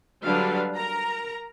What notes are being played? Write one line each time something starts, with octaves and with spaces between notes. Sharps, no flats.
D3 F#3 G3 D4 B4 F5
A#4 A#5